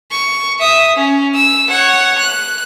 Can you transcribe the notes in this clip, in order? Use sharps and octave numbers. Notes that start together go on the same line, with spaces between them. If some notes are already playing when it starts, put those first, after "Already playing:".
C#6
E5 D#6
C#4
E6
C#5 F#5
F#6